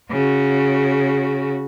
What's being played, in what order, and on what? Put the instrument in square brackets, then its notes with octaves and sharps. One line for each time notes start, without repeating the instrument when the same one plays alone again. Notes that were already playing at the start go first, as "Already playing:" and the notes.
[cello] C#3 F#4